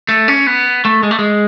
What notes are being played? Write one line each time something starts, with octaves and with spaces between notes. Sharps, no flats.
A3
C#4
B3
A3
G#3
A3
G#3